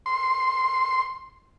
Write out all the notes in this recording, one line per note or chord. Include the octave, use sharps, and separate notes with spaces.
C6